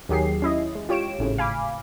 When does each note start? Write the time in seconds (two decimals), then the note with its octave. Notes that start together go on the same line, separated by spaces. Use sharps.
0.09 D#2 D#3 F#3 G4 G#4 C7
0.42 C#4 E4 D#5
0.75 G#3
0.89 F4 G4 C#5 D7 E7
1.19 G#1 A2 C#3
1.38 F5 G#5 B5 D6